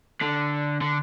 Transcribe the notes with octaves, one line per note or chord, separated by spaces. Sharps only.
D3
D3